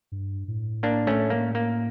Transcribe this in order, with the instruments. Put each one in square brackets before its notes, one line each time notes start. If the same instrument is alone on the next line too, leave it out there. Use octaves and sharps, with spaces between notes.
[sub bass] G2
A2
[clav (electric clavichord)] A#3 D4
A3 C#4
A#3
A#3